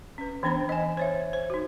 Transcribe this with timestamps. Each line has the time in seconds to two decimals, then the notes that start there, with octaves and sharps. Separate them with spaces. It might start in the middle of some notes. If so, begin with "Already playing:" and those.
0.18 C#4 B4
0.43 E3 B3 D4 C5 B5
0.69 D#5 G#5
0.97 C5 C#5 E5
1.33 C5
1.50 D#4 F#4